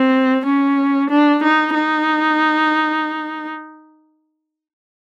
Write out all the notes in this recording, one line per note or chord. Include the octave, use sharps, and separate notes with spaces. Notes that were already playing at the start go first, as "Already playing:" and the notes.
Already playing: C4
C#4
D4
D#4
D#4